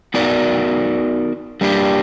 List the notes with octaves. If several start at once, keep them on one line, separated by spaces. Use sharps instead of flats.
B3 D#4 F#4 A#4 D5
G3 A#3 D4 G4